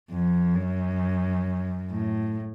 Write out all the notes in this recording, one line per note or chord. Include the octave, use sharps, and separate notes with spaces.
F2
F#2
A2